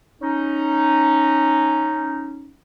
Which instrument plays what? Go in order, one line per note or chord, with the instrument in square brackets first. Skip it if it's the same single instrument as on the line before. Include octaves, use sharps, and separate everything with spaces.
[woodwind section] C#4 D#4